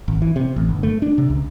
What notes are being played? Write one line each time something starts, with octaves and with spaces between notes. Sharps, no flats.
G#1
E3
C3
A1
G1
A3
D4
C3
C#2